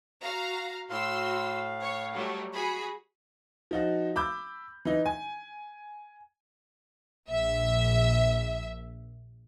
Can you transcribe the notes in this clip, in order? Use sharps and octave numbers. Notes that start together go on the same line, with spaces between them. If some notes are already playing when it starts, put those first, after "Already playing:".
F#4 F5 A#5
A2 F#4 F5 C6 E6
C#5
F#3 G3 A3
F#4 G#4 B5
F3 D#4 F#4
B5 D6 E6 G6
E3 D#4
G#5
A#1 E5